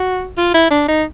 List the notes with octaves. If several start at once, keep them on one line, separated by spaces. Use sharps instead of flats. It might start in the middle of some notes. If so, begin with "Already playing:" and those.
Already playing: F#4
F4
E4
D4
D#4